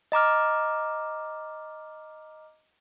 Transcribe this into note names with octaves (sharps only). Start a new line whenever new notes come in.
D#5 A#5 D6 F6